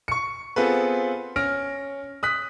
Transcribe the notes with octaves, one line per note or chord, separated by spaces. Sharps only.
C#6 C#7
B3 C4 F4 G#4 A4 B4
C#4 F6 A#6 D7
D#6 F#6 B6